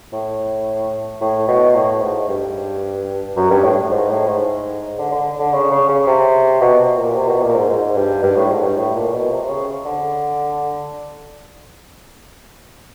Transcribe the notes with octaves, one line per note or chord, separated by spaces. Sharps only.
A2
A2
B2
A2
G#2
G2
F#2
G2
A2
G#2
A2
G#2
D3
D3
D3
C#3
C#3
C#3
C3
B2
B2
A#2
C3
B2
A#2
G#2
G#2
G2
G2
A2
G#2
G2
A2
A#2
B2
C3
C#3
D3